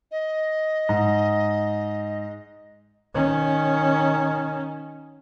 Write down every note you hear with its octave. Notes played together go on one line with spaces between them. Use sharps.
D#5
G#2
D#3 C#4